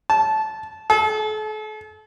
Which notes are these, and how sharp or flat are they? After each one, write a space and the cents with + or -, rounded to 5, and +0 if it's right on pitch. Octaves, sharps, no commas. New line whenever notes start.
A5 -15
A4 -40